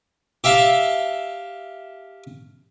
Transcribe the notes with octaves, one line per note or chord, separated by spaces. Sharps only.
G4 E5 F5 A5